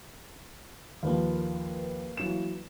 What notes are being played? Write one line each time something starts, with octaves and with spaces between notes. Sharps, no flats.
D#2 F3 A#3 B4 F5
E3 F#3 E7